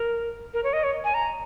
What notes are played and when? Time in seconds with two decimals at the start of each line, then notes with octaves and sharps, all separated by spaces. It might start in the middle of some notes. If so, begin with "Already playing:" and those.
Already playing: A#4
0.54 A#4
0.64 C#5
0.73 D#5
0.84 C#5
1.04 G#5
1.14 A#5